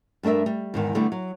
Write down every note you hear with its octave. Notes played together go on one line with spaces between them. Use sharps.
G2 A3 D4 A#4 E5
G3
E2 G#2 D#3
D3 G3 A3 B3 D4
F#3